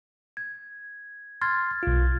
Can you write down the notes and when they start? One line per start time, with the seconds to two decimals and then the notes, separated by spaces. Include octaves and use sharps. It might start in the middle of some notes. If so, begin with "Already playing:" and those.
0.37 G#6
1.41 C6 F6 G#6 A6
1.83 B1 F4